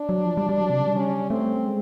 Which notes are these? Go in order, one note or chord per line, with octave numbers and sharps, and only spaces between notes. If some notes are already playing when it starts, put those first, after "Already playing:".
Already playing: D4
F#3
F3
G3
G3
F#3
C3
C#3
G3
C#4
A3 C4
G#3